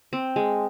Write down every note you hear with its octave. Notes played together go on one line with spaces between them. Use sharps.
C4
G#3